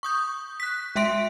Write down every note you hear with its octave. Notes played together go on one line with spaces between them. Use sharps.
C#6 D#6 G6
F#6 B6
G#3 E5 G5 C6 D7